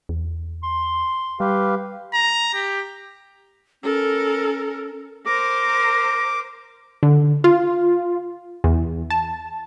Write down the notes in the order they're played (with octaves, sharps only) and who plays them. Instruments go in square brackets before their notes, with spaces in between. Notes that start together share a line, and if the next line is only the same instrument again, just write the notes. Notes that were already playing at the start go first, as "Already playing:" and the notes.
[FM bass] E2
[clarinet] C6
[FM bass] G3 [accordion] G4 B4 F5
[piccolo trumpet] A#5
G4
[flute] C#4 [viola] A4 A#4
[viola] A#4 C5 [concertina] D6 [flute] A#6
[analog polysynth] D3
F4
E2
A5